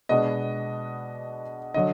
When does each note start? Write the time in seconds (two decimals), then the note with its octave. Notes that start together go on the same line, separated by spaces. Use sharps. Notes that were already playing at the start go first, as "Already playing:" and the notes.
0.09 B2 G#3 B3 D4 D#5
1.74 D3 F#3 D#5